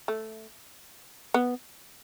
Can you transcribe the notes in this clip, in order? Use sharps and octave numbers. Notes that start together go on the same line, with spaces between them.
A3
B3